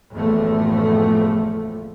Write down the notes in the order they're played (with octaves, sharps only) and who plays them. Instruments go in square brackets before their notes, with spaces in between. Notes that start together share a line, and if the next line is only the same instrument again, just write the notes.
[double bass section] F#1 E2 A2 F3 A3